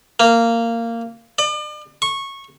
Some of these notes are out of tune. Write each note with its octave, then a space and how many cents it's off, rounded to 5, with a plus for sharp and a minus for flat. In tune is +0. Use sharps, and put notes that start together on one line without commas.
A#3 -15
D5 +40
C#6 -15